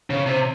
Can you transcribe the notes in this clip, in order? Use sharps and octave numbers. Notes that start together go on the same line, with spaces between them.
C#3
C3